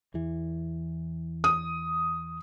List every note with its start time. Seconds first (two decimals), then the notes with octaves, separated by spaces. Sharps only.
0.14 E2 E3
1.44 D#6